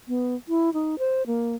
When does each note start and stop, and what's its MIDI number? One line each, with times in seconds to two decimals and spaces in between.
0.08 0.35 59
0.49 0.73 64
0.74 0.99 63
0.99 1.26 72
1.27 1.56 58